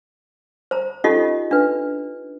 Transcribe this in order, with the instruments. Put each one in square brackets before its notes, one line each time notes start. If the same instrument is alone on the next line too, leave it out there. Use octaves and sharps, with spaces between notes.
[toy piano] C5 A#5
C#4 D#4 F4 G4 A4 D#5
D4 B4